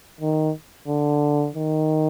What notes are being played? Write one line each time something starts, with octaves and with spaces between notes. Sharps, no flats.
D#3
D3
D#3